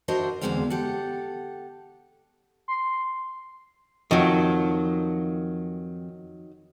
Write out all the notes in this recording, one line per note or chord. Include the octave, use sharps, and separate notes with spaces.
D4 F#4 A#4 C5 D#5 E5
E2 G2 D3 G#3 C4 F5
G4 A4 F#5
C6
F2 D#3 F#3